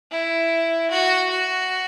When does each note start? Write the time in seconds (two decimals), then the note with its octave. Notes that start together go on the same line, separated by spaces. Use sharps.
0.11 E4
0.91 F#4
1.30 F#4